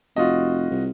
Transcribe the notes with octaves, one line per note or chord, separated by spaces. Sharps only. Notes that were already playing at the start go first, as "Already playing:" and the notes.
F1 F4 F#4 D#5
C2